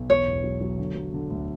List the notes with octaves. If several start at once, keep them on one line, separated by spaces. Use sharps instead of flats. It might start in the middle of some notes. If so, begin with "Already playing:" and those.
Already playing: B1
E2 C#5
E1
F#3
F#3
D3
F#3
D3
D2